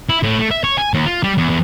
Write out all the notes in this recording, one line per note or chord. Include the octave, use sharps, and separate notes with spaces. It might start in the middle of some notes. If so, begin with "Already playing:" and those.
E4
A2
A3
E5
C#5
G#5
D#2
F4
G3
E2
E2